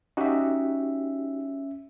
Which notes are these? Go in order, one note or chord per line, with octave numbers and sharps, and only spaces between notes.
C#4 D#4 F#4 G4 E5